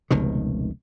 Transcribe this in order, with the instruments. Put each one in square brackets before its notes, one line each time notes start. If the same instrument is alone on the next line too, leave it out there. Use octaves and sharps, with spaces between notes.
[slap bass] F1 C#2 B2 D#3